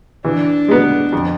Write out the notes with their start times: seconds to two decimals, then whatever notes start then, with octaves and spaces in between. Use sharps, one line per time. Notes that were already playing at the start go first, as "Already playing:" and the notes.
0.25 E3 D4
0.68 G#3 B3
1.12 F2